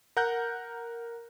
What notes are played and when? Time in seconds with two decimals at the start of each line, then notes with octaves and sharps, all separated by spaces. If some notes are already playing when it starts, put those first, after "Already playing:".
0.16 A#4 F#5 A#5 F#6 G6